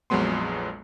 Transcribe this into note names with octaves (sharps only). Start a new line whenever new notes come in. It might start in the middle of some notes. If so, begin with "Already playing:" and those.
A#1 F2 F#3 G#3 B3 C6